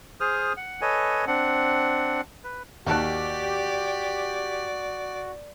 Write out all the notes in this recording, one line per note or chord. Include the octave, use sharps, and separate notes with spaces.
G#4 C5 D#6 F6
F#5
A4 B4 C#5 D#5 G#5
C4 D4 F#5
B4
D#2 F#4 G4 D5 A5 F#6